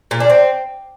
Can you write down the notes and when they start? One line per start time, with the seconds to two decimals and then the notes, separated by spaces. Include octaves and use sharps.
0.11 A#2
0.20 D4
0.30 C4